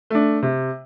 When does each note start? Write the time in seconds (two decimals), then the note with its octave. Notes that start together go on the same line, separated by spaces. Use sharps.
0.10 A3 D4
0.42 C3